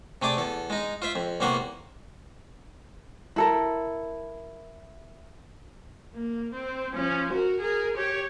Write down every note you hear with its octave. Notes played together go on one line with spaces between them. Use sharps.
C3 A3 G#4 D5 D6
E2 A4
G#3 D#4
F4 C5 E5
F2
E2 C3 A#3 C5 F#5 C#6
E4 A4 A#4
A#3
C4
F3 C#4
F#4 A#4
G#4 A#4
G4 C#5